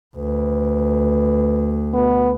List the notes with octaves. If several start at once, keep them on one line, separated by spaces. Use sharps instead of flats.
D2 B4
B2 B3